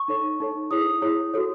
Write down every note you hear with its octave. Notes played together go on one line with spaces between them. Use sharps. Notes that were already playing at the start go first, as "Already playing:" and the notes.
Already playing: C#6
D#4 A4 C#5
D#4 A4 C#5
E4 G#4 C#5 D#6
E4 G#4 C#5
F#4 A4 C#5